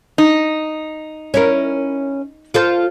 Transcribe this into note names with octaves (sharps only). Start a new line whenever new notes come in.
D#4
C#4 E4 A#4
F4 A4 C5